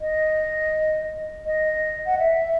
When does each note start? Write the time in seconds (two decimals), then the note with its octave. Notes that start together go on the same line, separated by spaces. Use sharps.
0.01 D#5
1.46 D#5
2.06 F#5
2.19 E5